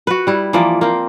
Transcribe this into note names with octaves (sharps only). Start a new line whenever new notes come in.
F#4 B4
G3 E4
E3 F3 A#3 D5
A#3 C4